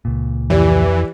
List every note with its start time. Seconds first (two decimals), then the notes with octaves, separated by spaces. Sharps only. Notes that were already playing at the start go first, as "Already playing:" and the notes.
0.05 C#2 A#2
0.50 F2 E3 G4 D5